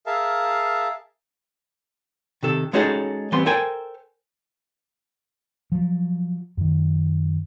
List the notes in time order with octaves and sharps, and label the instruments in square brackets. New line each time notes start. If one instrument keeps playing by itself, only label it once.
[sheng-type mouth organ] G#4 A#4 E5 F5 A5
[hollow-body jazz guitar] C3 D#3 A4
G#3 C#4 D#4 F#4 G#4 A4
E3 G3 B3 C4 C6
A4 A#4 C5 G5 G#5
[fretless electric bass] F3 F#3
F#2 D#3